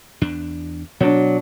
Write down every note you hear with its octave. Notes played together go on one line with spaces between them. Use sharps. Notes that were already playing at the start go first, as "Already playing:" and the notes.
E2 D4
B2 F#3 D4